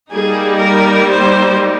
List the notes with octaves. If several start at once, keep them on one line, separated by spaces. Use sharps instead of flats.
G3 A#3 D#4 G#4
A#4
C5